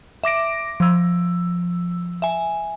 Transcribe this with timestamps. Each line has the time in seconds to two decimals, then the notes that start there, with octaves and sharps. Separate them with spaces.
0.24 E5 D6 A#6 D7
0.80 F3 E6
2.22 E5 G#5